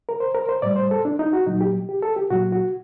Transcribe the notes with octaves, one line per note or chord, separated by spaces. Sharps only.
A#4
C5
A#4
C5
A2 G3 D5
C5
A4
D4
D#4
F#4
A#2 F#3 D#4
G4
G4
A4
G4
A#2 F#3 F#4
F#4